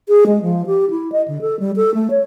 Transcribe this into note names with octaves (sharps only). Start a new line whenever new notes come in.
G#4
G#3
F3
G4
E4
D#5
D3
A4
G3
A4
A3
C#5